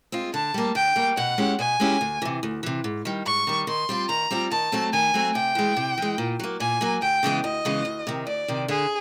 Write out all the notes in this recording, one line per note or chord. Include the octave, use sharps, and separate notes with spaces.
G#3 C4 F4
D3 A5
G3 A#3
D3 G5
G3 A#3
B2 F#5
G#3 C#4 E4 G4
B2 G#5
G#3 C#4 E4 G4
D2
C3 E3
D2
C3 E3
G#2
D#3 G3
G#2 C#6
D#3 G3
D#3 C6
G3 C4 F4
D#3 A#5
G3 C4 F4
D#3 A5
F#3 A3 C4
D#3 G#5
F#3 A3 C4
C3 G5
E3 G#3
C3
E3 G#3
A#2
F#3 A#3
A#2 G#5
F#3 A#3
D2 G5
C#3 E3 G#3 B3
D2 D#5
C#3 E3 G#3 B3
D2
C3 D#3
D2 D5
C3 D#3
D3 G#4